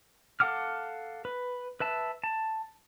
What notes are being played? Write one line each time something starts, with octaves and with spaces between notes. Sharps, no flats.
A4 F5 F#5 D6 F6
B4
B4 E5 A5
A5